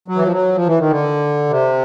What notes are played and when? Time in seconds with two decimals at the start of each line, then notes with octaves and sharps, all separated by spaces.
0.08 F#3
0.16 E3
0.25 F3
0.32 F#3
0.55 F3
0.67 E3
0.79 D#3
0.90 D3
1.50 C3